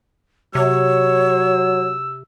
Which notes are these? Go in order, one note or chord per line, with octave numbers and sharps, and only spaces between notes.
C3 F#3 C#5 E6